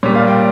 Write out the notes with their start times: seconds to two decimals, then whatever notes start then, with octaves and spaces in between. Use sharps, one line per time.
0.03 A#2 C#5
0.06 G3
0.15 F5
0.28 G5